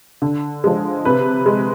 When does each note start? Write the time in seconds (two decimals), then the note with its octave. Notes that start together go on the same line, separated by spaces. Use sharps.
0.22 D3
0.64 F3 G#3
1.05 C3 B4
1.46 G#3